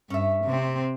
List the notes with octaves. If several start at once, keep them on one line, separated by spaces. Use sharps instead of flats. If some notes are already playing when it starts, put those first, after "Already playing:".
G2 C#4 E5
C3 C4